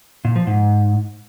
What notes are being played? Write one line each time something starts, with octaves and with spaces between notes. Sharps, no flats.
A#2
F3
G#2